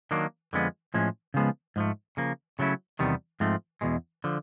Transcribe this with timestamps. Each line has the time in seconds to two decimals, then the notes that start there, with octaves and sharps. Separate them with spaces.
0.11 D#3 F#3 A#3 D4
0.53 F2 D3 F3 G#3 B3
0.94 A2 F3 G#3 C#4
1.34 C#3 F3 G#3 B3
1.76 G#2 F3 A3
2.17 C#3 F3 A#3
2.59 C#3 F#3 A3 C#4 E4
2.99 E2 C3 D#3 G3 B3
3.40 G#2 F3 A3 C4
3.81 E2 B2 G#3
4.24 D3 F3